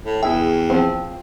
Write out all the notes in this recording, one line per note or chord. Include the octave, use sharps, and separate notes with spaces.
A2
E2 E4 G#4 E5 G5
F3 C4